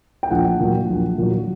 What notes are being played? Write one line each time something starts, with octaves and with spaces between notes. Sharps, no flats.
G5
A#1 F#5
A#2 F#3
A#1
A#2 F#3